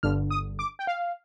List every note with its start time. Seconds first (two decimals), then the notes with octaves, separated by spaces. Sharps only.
0.03 G1 G2 D3 F6
0.31 D#6
0.59 D6
0.79 G5
0.87 F5